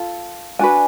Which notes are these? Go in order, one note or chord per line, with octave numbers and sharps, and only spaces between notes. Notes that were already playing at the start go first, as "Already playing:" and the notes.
Already playing: F4 A4
D4 F#4 B4 G#5